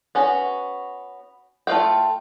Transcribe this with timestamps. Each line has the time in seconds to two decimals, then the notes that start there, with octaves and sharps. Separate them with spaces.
0.15 B3 C#4 F#4
1.67 A3 F4 D5 F5 G5